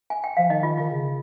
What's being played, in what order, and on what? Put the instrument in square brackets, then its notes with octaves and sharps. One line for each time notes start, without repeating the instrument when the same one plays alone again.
[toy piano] G#5
G5
[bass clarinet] F3 [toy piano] F5
[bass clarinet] D#3 [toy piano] D#4 D#5
[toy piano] F4
[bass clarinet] D#3 [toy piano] F4
[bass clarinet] C#3